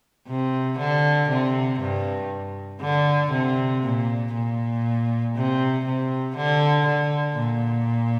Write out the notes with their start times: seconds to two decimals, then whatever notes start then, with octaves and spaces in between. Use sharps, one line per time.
0.28 C3
0.78 D3
1.29 C3
1.80 G2
2.81 D3
3.32 C3
3.83 A#2
4.33 A#2
5.35 C3
5.85 C3
6.36 D3
6.87 D3
7.37 A#2